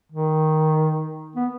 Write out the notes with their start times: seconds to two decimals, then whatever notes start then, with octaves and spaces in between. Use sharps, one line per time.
0.12 D#3
1.36 B3